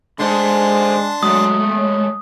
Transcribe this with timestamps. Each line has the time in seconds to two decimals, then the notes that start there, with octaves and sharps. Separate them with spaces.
0.19 D3 G#3 D4 C5 D#5 A5 C6
1.23 F#3 G#3 A3 D#6
1.77 C#5